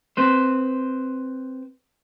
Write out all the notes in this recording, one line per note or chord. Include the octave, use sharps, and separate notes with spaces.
C4 B4 C5